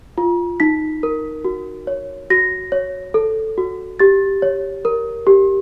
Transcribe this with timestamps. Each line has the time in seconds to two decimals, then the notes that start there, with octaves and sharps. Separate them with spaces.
0.18 F4
0.60 D#4 B6
1.03 A#4
1.44 F#4
1.87 C#5
2.30 F#4 A#6
2.72 C#5
3.14 A4
3.58 F#4
3.99 G4 A6
4.42 C#5
4.85 A#4
5.27 G4